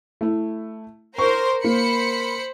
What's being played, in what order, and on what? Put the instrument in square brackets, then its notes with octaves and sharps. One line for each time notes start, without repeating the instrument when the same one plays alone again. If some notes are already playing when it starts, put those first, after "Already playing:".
[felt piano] A3 E4
[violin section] A#4 C5 C6 [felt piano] C#6
[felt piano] A#3 [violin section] C5 B5 C#7